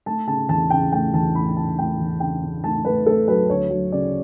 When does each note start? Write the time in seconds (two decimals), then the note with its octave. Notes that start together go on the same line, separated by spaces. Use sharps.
0.06 A3 A5
0.27 C#3 A5
0.49 E2 A5
0.70 C#3 G5
0.92 A3 G5
1.13 E2 A5
1.35 A3 B5
1.56 C#3 A5
1.78 A3 G5
2.00 E2
2.20 C#3 G5
2.43 C#3
2.64 A3 A5
2.85 A3 B4
3.06 A3 A4
3.28 F#3 B4
3.50 D2 C#5
3.71 F#3
3.92 C#3 D5